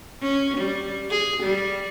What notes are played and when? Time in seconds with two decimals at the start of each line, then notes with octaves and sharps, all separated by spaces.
0.22 C#4
0.58 G3
1.10 G#4
1.44 G3